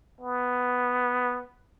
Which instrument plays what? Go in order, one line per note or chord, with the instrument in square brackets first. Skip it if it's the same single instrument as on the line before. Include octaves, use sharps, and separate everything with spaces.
[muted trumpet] B3